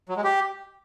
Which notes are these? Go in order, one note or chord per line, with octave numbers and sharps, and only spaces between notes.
F#3
G#3
G4